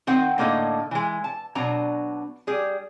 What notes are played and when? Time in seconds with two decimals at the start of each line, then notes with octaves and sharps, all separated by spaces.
0.07 D#3 C4 D#4 F#5
0.38 A2 D3 A#3 D#4 A4 D#5
0.91 E3 G#3
1.24 A5
1.55 B2 F#3 D4 A#5
2.47 G3 G#4